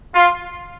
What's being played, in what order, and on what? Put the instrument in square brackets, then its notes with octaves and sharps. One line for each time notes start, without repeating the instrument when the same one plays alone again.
[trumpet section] F4